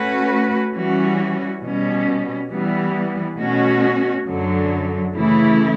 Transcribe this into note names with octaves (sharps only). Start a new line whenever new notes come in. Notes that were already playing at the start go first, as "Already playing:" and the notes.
Already playing: A3 C#4 F#4 B4
E3 G3 C#4 F#4
B2 G3 C#4
E3 G3 B3
B2 A3 C#4 F#4
F#2 D3 F#3
C#3 E3 A3 E4